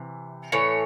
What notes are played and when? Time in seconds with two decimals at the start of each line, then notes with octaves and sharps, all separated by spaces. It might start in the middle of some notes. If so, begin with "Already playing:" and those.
Already playing: C3 E3
0.52 A2 E3 C#5